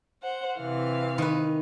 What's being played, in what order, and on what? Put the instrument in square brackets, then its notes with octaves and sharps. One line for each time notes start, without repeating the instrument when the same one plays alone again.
[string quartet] C5 F#5
C3 E3 F5
[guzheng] D#3 B4